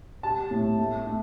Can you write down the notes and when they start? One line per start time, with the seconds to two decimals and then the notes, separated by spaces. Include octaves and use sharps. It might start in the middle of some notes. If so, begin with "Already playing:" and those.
0.23 G3 A5
0.51 A2
0.79 A3
1.07 A3